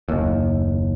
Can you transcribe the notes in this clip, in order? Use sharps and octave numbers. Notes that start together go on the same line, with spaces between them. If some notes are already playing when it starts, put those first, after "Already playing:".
F#1 D#2